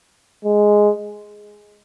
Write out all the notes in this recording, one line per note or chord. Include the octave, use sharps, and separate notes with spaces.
G#3